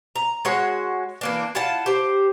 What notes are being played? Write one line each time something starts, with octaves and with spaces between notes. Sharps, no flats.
A#5
G#3 F#4 C#5 F#5
E3 A#3 D4
E4 F4 F#5 A5
G4 C5